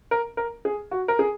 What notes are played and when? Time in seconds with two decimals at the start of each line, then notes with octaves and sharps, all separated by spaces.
0.11 A#4
0.37 A#4
0.65 G#4
0.91 F#4
1.08 A#4
1.19 G#4